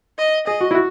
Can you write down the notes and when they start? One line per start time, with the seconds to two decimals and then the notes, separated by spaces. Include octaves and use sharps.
0.18 D#5
0.47 G#4 D#5
0.61 F#4
0.71 E4
0.75 F#4